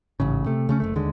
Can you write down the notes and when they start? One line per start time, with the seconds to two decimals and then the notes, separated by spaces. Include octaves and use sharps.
0.20 A1 G#2 C#3
0.46 C3 A3
0.69 C#3 A3 C#4
0.80 F#1 C#2 A3
0.95 D#2 D3 G#3